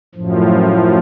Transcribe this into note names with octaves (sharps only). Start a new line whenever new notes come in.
F#2 A2 F3